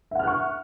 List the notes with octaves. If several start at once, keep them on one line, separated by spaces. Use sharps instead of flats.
E5 F#5 C#6 F6 F#6